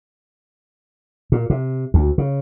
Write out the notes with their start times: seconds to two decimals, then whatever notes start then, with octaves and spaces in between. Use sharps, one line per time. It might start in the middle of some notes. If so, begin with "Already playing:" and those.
1.32 A#2
1.50 C3
1.94 D2
2.18 C#3